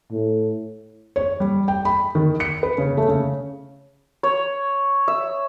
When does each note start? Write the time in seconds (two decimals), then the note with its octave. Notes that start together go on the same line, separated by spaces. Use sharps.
0.11 A2
1.16 C#5
1.40 G3
1.68 G5
1.85 B5
2.15 D#3
2.40 C#7
2.63 B4
2.78 C#3
2.97 A3
3.09 C#3
4.23 C#5
5.08 E5